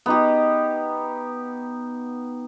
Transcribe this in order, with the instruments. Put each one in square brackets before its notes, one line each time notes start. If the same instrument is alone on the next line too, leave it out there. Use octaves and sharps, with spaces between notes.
[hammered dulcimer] B3 D#4 G4